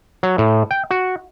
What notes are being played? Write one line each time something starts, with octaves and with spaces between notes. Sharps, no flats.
F#3
A2
G5
F#4